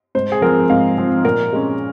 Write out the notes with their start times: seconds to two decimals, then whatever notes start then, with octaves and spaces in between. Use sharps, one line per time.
0.15 G#2 C5
0.32 G#4
0.42 F3 C4 A#4
0.70 G#2 F5
0.97 F3 C4
1.25 A#2 A#4
1.53 G#3 C#4